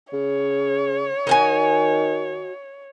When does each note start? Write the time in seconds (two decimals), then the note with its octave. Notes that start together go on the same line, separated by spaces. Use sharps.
0.13 C#3 C#5
1.27 D#3 D#4 F#4 G#5